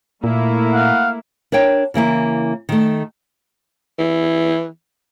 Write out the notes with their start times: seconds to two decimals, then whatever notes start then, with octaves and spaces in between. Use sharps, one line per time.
0.24 A#2 A3 A#3 E4
0.73 F5 F#5
1.52 D4 A#4 C#5 G5
1.94 C#3 E3 A#3 E4
2.69 D#3 A3
3.99 E3